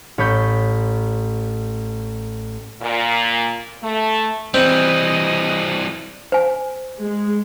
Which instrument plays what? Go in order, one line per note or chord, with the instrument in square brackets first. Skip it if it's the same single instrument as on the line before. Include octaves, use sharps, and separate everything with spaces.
[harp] A1 C#5 B5 G6
[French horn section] A#2
A3
[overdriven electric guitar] E3 G3 [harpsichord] C4 [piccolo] D#5
[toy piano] C5 G#5
[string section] G#3